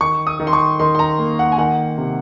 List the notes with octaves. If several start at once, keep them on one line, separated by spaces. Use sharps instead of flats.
D#3 C#6
D#6
D#3
C6
C#6
D#3 C6
C6
A#5
A#3
F#5
G#5
D#3 F#5
C3